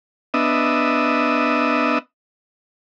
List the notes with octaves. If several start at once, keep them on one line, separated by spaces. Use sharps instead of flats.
B3 D4 D#5 E5